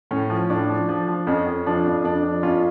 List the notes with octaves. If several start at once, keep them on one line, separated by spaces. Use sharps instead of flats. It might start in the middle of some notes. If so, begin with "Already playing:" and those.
A2 C#4
F3
A2 D4
F3
F3
F3
F2 C#4
F2
F3 D4
F2
F2 D4
F3
F2 C#4 F4